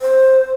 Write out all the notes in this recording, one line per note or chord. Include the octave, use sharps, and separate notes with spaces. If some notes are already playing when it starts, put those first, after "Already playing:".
C5